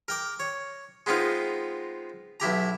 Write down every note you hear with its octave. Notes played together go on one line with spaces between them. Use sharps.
A#4 G5 D6
C#5
G#3 B3 C4 D#4 F4
B1 E4 G4 A#5